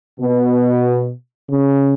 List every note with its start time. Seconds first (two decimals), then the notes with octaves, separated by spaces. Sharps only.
0.20 B2
1.50 C#3